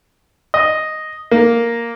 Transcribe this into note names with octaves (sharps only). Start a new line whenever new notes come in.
D#5
A#3